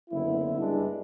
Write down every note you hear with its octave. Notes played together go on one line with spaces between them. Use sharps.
F#1 D3 B3 E4
G2 G#3 D4